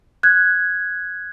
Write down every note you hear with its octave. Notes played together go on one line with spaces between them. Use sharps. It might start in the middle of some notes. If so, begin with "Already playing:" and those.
F#6 G#6